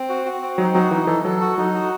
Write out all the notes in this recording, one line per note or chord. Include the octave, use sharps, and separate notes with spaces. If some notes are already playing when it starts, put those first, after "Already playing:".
Already playing: C4
F#4
F#4
C4
F#3 D#4
F#3 F#4
E3 D#4
E3 A4
F#3 A4
F#4
F#3 D#4
F#4